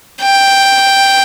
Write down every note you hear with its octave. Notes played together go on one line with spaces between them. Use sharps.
G5